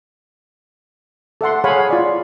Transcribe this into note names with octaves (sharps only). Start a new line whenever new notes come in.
A4 E5 F#5 C6
G#4 C#5 F5 F#5 G#5 B5
F4 D5